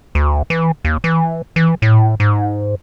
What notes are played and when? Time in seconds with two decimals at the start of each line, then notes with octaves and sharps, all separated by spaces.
0.15 D2
0.50 E3
0.85 D#2
1.04 E3
1.56 E3
1.82 A2
2.20 G#2